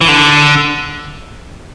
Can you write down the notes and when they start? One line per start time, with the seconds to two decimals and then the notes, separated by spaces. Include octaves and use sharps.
0.01 E3
0.08 D3